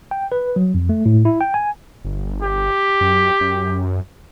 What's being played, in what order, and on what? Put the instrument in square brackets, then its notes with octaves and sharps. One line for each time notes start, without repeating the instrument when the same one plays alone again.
[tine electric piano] G5
B4
F#3
F2
A3
A2
E4
G5
G#5
[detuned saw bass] G1
[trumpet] G4
[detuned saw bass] F#2
F#2